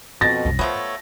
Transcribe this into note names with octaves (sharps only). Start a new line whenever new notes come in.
F2 B2 C4 A6 A#6
C2 F#2
F3 A3 B3 F4 C#5